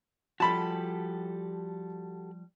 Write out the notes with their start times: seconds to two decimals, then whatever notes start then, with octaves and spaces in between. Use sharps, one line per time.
0.40 F3 G3 F#4 G4 A4 A5 B5